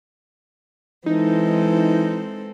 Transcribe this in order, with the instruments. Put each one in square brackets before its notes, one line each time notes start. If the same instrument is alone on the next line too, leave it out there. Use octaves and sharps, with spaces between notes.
[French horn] E3 [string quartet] G#3 C4 A4 [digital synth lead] D#4